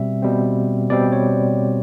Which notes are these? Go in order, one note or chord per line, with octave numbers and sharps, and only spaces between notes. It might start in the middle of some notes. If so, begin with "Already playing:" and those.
Already playing: B2 G3 C4 E5
B2 G3 C4
B2 G3 C4 D5
C#5